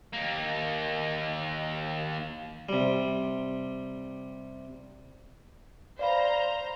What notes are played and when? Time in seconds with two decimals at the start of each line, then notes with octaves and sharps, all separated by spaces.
0.13 D#2 A#3
2.69 C3 G3
5.99 C5 D5 F5 A#5 B5